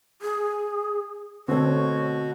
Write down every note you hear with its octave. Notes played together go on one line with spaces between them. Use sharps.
G#4
B2 D3 A3 C4 F#4 C#5